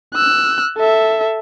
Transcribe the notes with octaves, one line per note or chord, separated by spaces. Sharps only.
E6 F#6
A4 E5